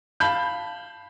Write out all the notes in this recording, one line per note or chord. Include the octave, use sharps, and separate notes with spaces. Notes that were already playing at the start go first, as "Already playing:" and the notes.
F5 A5 B5 G6